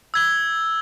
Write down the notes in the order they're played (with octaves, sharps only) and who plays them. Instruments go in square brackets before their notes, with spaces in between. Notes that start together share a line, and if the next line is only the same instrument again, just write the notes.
[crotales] E6 G#6 G7